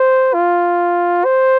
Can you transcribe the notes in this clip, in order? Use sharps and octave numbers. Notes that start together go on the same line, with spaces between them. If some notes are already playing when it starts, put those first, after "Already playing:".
Already playing: C5
F4
C5